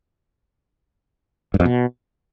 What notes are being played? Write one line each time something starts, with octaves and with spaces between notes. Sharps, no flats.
G2
F2
B2